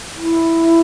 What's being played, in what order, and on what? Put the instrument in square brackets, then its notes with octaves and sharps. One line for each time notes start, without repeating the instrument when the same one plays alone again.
[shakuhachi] E4